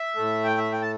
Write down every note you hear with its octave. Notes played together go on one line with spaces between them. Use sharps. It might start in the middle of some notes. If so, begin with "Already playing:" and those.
Already playing: E5
A2 A3
G5
E5
G5
A5